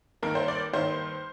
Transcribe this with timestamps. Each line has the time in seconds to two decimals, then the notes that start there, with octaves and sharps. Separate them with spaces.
0.23 G2 D#3 A#3 A#4
0.35 C5
0.48 D5
0.73 G2 D#3 A#3 C5